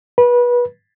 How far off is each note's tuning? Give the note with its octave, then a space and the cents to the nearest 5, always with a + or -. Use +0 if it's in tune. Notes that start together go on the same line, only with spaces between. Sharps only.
B4 -25